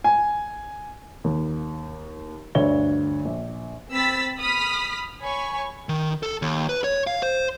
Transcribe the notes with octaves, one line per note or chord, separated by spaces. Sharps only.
G#5
D#2
D2 G2 D3 C#5 G7
A#1
C4 B5 E6 A6 B6
B5 D#6 F6 B6
C#5 G#5 B5 C#6
D#3
A4
D#2
B4
C#5
F5
C5